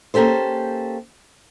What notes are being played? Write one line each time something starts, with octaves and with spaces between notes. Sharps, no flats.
A#3 C#4 G4 A4 C5